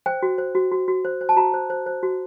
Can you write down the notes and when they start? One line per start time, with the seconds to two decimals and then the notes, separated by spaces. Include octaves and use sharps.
0.06 C5 G5
0.22 F#4
0.38 C5
0.55 F#4
0.72 F#4
0.88 F#4
1.05 C5
1.21 C5
1.29 A5
1.37 F#4 A#5
1.54 C5
1.70 C5
1.86 C5
2.03 F#4